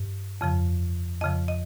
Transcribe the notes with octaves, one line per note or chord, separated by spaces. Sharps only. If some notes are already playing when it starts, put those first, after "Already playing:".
Already playing: G2
F2 C#3 F3
F2 C#3 F3 D#5
D#5